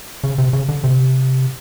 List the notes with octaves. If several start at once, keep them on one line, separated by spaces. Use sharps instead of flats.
C#3
C3
C#3
D3
C3